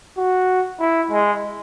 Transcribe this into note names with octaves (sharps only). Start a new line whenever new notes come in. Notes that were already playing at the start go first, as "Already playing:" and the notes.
F#4
E4
G#3